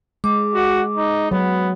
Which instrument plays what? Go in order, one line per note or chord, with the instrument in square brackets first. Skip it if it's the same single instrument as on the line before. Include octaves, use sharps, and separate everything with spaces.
[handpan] G#3 [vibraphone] D6
[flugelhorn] F#4
D#4
[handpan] F#3 [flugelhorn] B3